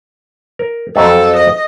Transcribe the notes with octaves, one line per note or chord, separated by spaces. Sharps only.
A#4
F2 F#3 C4 A4
D#5